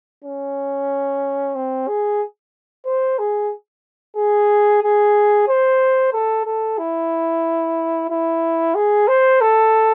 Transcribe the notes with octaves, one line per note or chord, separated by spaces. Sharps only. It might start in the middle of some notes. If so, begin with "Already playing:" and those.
C#4
C4
G#4
C5
G#4
G#4
G#4
C5
A4
A4
E4
E4
G#4
C5
A4